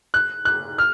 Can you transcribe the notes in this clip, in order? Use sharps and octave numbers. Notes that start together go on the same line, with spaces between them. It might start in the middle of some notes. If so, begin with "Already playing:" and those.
F#6
F#6
F6